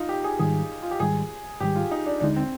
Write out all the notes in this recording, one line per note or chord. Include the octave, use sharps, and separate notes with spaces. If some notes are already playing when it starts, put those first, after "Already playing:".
Already playing: D#4 F4
G4
G#4
G#2 D#3 G3 G#4
F4
G4
G#2 D#3 G3 G#4
G#2 D#3 G3 G4
F4
D#4
D4
D#2 D3 G#3 D4 D#4
C4